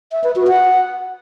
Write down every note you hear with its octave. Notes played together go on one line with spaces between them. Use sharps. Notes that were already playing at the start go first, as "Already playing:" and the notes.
E5
B4
F#4
F#5